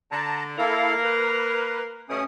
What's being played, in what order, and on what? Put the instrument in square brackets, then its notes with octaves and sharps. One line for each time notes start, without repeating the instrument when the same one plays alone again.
[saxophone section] D3 [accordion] A5 A#5
[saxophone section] A#3 A#4 [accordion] E4 A4 F5
[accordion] B4
[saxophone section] G2 B2 A3 [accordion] C#4 D#6